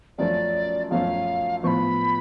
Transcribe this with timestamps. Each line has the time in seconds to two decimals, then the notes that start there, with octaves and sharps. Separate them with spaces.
0.18 F#2 F3 A3 C#4 D5
0.91 F#2 F3 A3 C#4 F5
1.63 A2 F3 B3 B5 C#6